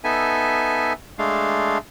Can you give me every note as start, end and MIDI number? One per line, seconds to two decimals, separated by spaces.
0.04 0.93 59
0.04 0.93 63
0.04 0.93 69
0.04 0.93 76
0.04 0.93 80
1.19 1.78 56
1.19 1.78 57
1.19 1.78 62
1.19 1.78 77